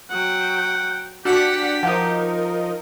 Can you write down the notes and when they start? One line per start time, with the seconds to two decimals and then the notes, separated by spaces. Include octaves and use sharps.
0.10 F#3 F#5 G5
1.25 D4 F#4 G4 F#5 B6
1.83 F3 D#4 A#4 F#5